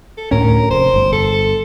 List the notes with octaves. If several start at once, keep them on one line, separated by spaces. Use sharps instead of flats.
A4
D2 A2 C#4 A#4
F1 C5
G1
A4